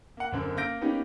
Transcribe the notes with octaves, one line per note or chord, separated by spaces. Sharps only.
A#3 F#5
F#1 F#2 D3 C4 A#4
A#3 A#4 G6 A#6 D7
A#3 B3 C#4 D#4 G4 G#5